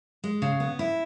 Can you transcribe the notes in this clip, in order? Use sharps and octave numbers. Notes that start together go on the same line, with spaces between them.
G#3
C#3
B3
E4